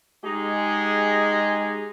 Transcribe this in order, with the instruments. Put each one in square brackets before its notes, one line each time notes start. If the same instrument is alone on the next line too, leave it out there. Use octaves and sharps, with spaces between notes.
[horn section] G#3 D#4 G4 G#4